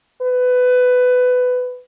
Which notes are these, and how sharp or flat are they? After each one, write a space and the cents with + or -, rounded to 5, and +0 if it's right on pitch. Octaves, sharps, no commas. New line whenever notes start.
B4 +20